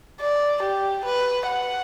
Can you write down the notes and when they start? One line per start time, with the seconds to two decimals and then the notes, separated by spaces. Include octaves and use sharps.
0.20 D5
0.63 G4
1.05 B4
1.47 F#5